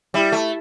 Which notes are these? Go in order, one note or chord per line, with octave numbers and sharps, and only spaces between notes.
G3 E4
A3